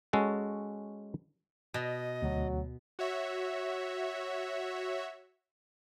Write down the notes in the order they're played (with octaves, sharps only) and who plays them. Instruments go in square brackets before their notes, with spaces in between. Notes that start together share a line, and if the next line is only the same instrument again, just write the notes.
[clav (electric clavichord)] G#3 C#4 F#4 A4
[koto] B2 [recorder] D#5
[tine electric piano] D2 [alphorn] F#3
[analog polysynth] F#4 C#5 E5